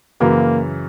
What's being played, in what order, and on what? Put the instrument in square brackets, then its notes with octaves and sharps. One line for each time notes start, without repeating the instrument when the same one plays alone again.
[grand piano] F#2 C#3 E3 [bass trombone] A#3